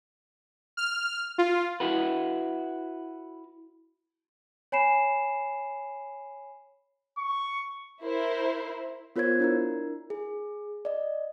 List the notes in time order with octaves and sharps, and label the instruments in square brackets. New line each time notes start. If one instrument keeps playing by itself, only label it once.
[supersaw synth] F6
F4
[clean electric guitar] E4 F#4 B4
[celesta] C#5 G#5 B5 C7 E7
[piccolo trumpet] C#6
[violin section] E4 A#4 C5
[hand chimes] B3 F4 A#4 C5 C#5 G#6
D4 E4 A#4
G#4
D5 D#5